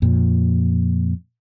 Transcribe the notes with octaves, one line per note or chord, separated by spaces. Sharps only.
F2 A#2 F3